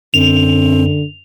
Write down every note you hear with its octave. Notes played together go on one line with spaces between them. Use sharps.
F#2 D3 C4 F7